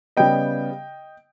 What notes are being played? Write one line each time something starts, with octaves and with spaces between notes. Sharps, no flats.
C#3 G3 B3 D#5 G5